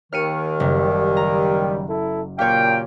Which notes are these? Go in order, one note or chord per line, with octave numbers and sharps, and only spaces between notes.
D#2 D#3 F6 C#7 D#7
F#1 G3
A#5
E4 A4
A#2 G4 C#5 F5 G5